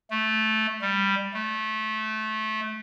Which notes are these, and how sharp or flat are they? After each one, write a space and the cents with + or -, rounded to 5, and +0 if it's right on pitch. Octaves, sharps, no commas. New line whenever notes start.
A3 -10
G3 +5
A3 -20